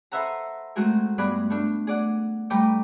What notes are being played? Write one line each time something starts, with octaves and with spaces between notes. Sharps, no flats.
A4 B4 C5 E5 F#5 A#5
G#3 A3 C4 F#4 G#4 A#4
G2 B3 G#4 D5 B5 F#6
A3 D4
G#4 D5 F#5
G3 A3 B4 G5 A#5 D6